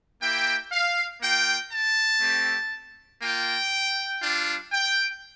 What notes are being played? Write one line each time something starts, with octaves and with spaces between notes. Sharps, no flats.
A#3 E4 G4 G5
F5
A#3 F4 G5
A5
A3 C4 G4
A#3 F4 G5
G3 D4 F4
G5